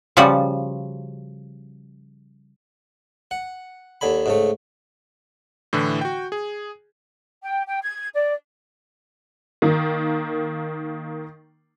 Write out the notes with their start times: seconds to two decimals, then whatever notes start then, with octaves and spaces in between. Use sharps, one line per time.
0.17 C#3 F3 G3 F#4 A5
3.31 F#5
4.01 D#2 D3 G#5 B5
4.26 G#2 C#3 A3
5.73 A2 D3 E3
6.01 F#4 G5
6.32 G#4
7.43 G5
7.67 G5
7.82 G#6
8.14 D5
9.62 D#3 A#3